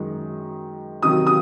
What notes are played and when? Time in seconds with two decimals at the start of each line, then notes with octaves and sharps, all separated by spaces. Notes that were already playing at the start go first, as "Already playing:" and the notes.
Already playing: F#2 D#3 G#3
1.02 C3 D#3 F#3 D#6
1.27 D#6